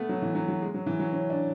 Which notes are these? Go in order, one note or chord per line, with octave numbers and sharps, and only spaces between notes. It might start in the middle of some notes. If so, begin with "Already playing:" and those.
Already playing: A3 B3
F#3
E3
F#3
F#3
G#3
F#3
E3
F#3
C#4
D4